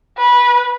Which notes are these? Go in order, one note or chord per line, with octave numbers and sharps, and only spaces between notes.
B4